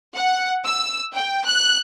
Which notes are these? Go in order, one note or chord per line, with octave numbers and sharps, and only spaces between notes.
F#5
E6
G5
F#6